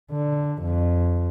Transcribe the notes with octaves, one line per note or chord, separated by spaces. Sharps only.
D3
F2